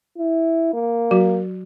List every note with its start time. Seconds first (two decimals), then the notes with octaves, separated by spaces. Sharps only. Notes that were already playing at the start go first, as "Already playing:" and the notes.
0.17 E4
0.74 A#3
1.11 F#3 F#4